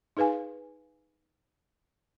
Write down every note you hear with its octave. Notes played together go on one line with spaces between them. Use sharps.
D#4 G#4 B4 F5 G#5